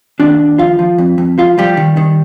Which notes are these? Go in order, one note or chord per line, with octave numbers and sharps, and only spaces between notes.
D#2 D4 D5
D#2
F3 F4 F5
F3
F2
F2
F3 F4 F5
F3 G3 G4
D#3
D#3